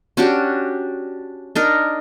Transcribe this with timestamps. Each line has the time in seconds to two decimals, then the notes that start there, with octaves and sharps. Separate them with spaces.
0.17 C#4 D4 F#4 G4
1.55 D4 D#4 A#4